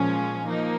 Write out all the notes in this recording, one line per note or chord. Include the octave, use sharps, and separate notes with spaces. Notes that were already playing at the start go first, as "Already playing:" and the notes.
Already playing: A#2 F3 G#3 C#4
F3 A#3 D#4